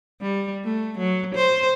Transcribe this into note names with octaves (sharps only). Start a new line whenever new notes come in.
G3
A3
F#3
C5